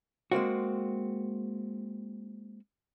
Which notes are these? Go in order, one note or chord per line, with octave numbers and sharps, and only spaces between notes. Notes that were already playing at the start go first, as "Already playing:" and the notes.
G#3 A#3 C4 F#4